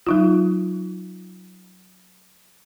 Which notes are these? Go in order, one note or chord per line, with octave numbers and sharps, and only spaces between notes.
F#3 D#4 F4